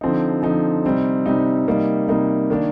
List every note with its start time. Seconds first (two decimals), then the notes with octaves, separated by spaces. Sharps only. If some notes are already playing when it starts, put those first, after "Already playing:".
0.01 D3 F3 C4 D#4
0.43 D3 F3 C4 D#4
0.85 C3 G3 C4 D#4
1.26 C3 G3 C4 D#4
1.67 C3 G3 A#3 D#4
2.09 C3 G3 A#3 D#4
2.50 D#3 A#3 D4